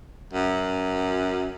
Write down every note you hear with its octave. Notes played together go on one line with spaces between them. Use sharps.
F#2